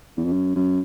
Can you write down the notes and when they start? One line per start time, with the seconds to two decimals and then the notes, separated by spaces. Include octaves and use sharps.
0.17 E2
0.25 F2
0.32 F#2
0.56 F#2